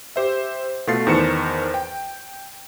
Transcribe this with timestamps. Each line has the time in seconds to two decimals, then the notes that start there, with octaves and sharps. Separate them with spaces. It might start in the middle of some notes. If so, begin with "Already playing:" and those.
0.16 G4 C5 E5
0.87 B2 A3 F4 F5 A6 C7
1.07 E2 D#3 C5 A5 C#7 E7
1.74 G5